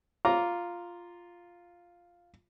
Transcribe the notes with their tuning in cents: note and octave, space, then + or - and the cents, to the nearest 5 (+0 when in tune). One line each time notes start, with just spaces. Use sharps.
F4 +0 A#5 +0 D6 -15